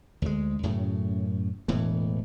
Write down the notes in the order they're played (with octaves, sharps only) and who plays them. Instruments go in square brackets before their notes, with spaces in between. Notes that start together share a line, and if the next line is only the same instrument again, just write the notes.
[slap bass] D2 G#3
F#2 A2 C#3
E1 A2 E3